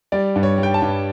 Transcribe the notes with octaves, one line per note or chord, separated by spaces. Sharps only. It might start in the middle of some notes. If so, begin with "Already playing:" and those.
G3 D5
G2
C#5
G3
G5
A5
G2